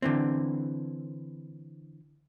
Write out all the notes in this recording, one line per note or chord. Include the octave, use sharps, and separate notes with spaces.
D3 E3 C4